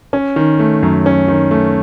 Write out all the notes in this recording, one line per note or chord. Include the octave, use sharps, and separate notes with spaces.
C#4
D#3
A3
F#2
C#4
D#3
A3